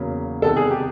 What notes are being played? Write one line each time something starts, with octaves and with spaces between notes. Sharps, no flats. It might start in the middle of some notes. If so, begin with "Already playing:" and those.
Already playing: E2 C#3 F#3 A#3 C#4
C3 D#3 G3 B3 A4
G#4
G4